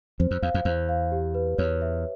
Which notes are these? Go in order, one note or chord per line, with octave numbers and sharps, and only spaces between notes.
F2 C5
F2
E2 F5
F2
E2 C5
F5
G4
B4
E2 C#5
E5